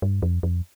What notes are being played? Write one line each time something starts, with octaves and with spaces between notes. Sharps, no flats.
G2
F2
F2